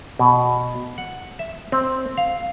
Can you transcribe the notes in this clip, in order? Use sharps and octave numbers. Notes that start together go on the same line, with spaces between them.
B2
F#5
E5
C4
F5